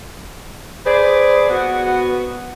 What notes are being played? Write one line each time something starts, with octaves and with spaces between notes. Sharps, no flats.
G#4 B4 C5 D5
B3 F#4